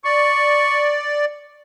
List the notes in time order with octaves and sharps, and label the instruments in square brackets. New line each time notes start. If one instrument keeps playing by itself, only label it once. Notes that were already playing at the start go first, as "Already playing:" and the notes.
[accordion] D5 [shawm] C#6